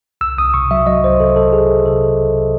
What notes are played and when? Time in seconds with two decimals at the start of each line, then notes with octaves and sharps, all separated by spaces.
0.21 C2 E6
0.38 C2 D#6
0.54 C3 C#6
0.71 F#3 E5
0.87 F#3 D#5
1.03 C2 C5
1.20 C3 A4
1.36 F#3 A4
1.53 F#3 G#4
1.70 C2
1.85 C3 A4
2.02 C2
2.18 C2